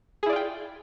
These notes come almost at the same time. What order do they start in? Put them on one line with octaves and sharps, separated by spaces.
G#4 E4 D5 F4 G5